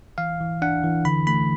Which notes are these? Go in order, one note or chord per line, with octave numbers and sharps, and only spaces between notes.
E3 F5
E3
D4 F#5
E3
D3 B5
A3 B5